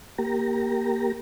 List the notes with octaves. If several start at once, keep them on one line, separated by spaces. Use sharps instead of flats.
A#3 G4 A#5